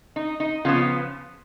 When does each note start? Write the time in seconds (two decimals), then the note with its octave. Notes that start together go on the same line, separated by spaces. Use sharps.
0.16 D#4
0.40 D#4
0.65 C#3 F3 B3 C#4 F4